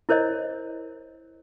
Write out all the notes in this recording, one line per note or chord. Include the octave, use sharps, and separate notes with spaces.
E4 A#4 C5 C#5 D#5